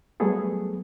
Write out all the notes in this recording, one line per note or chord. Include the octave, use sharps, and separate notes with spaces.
F#3 G3 A3 B3 G#4 A4